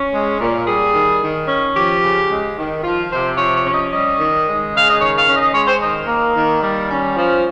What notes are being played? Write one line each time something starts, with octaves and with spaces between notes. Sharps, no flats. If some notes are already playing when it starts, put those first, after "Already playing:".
Already playing: C#4
G#3
A#2
G3 G#4
D#3
D#3
C#4
F3 G4
C#3
G#3
D#3
F3 F4
C3 C5
F3 C#5
C#5
C#4
D#5
G3 D#5
D#3
G#3
C#3 F5
D#5
D#3 C#5
F5
C#4
D#5
G#3 C#5
C5
D#3 D#5
A#3
D#3
G3
C#4
F3